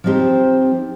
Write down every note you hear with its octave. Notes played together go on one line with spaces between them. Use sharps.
F3 C4 D#4 G4 C5